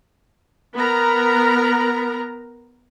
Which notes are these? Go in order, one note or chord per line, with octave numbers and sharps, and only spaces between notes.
B3 A#4 A#5